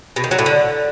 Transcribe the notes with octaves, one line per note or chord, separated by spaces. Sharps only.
B2
D#3
F#3
A2
D3